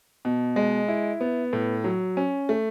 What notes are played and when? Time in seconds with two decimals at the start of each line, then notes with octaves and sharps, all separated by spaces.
0.25 B2
0.56 G#3
0.88 E4
1.21 B3
1.53 A2
1.84 F#3
2.17 C#4
2.49 A3